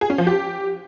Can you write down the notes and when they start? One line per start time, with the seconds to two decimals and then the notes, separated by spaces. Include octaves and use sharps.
0.01 G#4
0.10 C#4
0.18 F3
0.27 G4